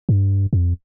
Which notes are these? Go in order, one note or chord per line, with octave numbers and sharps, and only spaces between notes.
G2
F2